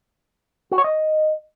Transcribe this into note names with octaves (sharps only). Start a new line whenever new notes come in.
F#4
C#5
D#5